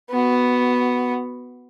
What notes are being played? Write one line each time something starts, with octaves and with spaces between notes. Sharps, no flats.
B3 F#4